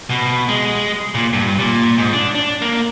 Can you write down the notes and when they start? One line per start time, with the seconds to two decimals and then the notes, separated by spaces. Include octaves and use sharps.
0.10 B2
0.49 G#3
1.15 A#2
1.33 G2
1.59 A#2
1.98 G#2
2.13 D4
2.35 D4
2.62 A#3